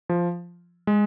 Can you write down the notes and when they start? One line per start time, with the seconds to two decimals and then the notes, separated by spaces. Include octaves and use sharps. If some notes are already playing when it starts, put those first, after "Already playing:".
0.09 F3
0.87 G#3